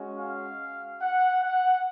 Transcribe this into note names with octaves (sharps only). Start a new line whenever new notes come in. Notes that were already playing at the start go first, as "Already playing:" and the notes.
Already playing: G#3 C#4 F#4
F5
F#5
F#5